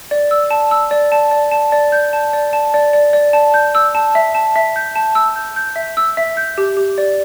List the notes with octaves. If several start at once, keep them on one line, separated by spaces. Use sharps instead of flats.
D5
E6
A5
E6
D5
A5
D5
A5
D5
G6
A5
D5
A5
D5
D5
D5
A5
G6
E6
A5
E5
A5
E5
G6
A5
E6
G6
G6
E5
E6
E5
G6
G4
G4
D5